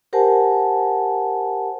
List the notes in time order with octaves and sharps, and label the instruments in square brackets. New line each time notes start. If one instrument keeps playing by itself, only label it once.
[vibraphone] G4 A#4 C5 F#5 G#5 A5